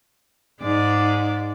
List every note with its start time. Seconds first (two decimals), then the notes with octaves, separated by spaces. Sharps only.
0.62 G#2 G#3 D5